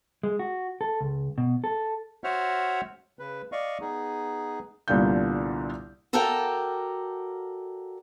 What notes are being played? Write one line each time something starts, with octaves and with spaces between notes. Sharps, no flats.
G#3
F#4
A4
C#2
B2
A4
F#4 C5 C#5 E5 F#5 F6
C#3 B4
D5 D#5 F5 C#6
B3 D#4 G#4
C2 A#2 D3 B3 F5 G6
F#4 A4 A#4 D5 F5 G5